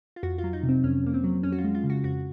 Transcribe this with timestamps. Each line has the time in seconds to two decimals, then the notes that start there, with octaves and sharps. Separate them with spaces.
0.16 F4
0.23 F2 F#4
0.38 F4
0.44 F#3
0.53 D#4
0.63 C3
0.69 C4
0.84 F2 C#4
1.03 F2 A#3
1.14 C4
1.24 F#3
1.43 F2 C#4
1.52 F#4
1.58 F4
1.64 G#3
1.75 F4
1.84 C#3
1.90 F#4
2.04 F2 F#4